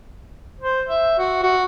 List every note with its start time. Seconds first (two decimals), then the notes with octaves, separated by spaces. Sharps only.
0.60 C5
0.89 E5
1.18 F#4
1.43 F#4